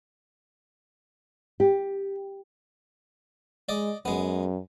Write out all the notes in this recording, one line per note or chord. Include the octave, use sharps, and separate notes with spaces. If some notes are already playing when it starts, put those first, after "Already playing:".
G4
G#3 D5 D#5
F#2 G#3 B3